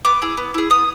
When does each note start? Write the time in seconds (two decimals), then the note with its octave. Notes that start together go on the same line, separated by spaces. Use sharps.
0.05 B3 D6
0.22 E4 G#4
0.37 B3
0.54 E4 G#4
0.70 B3 D#6